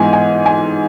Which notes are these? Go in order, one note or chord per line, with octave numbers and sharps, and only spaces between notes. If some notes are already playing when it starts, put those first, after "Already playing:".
Already playing: G#2 E3 G#3 B3 G#5
G#5
G#5